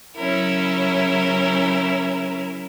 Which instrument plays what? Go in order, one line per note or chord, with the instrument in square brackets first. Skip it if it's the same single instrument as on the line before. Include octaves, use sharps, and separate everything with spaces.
[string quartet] C#3 F#3 C#4 E4 A#4